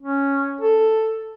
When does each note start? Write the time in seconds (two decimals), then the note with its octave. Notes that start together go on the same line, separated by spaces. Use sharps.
0.01 C#4
0.61 A4